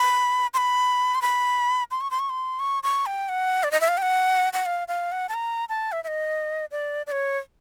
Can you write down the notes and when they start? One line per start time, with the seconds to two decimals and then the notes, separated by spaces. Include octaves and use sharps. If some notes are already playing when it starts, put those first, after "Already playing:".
Already playing: B5
0.54 C6
0.57 B5
1.15 C6
1.22 B5
1.91 C6
2.01 C#6
2.11 C6
2.19 C#6
2.29 C6
2.59 C#6
2.83 C#6
3.06 G5
3.29 F#5
3.63 D5
3.71 D#5
3.81 E5
3.88 F5
3.97 G5
4.02 F#5
4.53 F#5
4.66 F5
4.88 F5
5.12 F#5
5.29 A5
5.34 A#5
5.69 A5
5.92 E5
6.04 E5
6.08 D#5
6.71 D5
7.07 D5
7.12 C#5